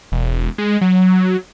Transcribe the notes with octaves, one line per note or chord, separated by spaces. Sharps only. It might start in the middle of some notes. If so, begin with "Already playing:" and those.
E1
G#3
F#3